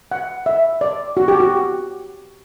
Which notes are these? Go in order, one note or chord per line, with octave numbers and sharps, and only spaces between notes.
F#5
E5
D5
F#4
G4
F#4